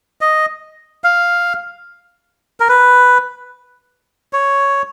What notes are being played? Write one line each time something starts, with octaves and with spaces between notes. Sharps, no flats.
D#5
F5
A#4
B4
C#5